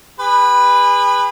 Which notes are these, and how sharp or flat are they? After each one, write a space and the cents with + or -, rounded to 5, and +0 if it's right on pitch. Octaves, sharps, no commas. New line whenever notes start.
G#4 -40 B4 +0